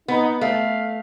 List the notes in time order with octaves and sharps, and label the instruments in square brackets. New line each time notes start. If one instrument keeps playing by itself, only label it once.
[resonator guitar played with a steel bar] B3 [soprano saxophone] D#4
[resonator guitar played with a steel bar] A3 [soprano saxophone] F5